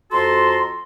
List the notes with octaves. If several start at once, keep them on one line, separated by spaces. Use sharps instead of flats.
F2 F#4 A4 A#5 C6